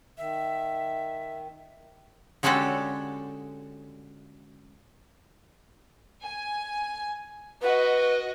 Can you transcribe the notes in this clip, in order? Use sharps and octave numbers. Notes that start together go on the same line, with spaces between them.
D#3 E5
D3 G#3 C#4 F#4 G4 A4
G#5
F#4 B4 D#5